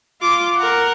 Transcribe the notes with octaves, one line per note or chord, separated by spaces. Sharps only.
F4 D6
A#4 F#5